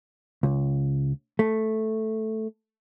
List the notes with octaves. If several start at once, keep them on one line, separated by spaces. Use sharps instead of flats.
C#2
A3